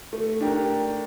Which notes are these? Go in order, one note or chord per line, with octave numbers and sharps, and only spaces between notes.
A3
D4 G4 A#4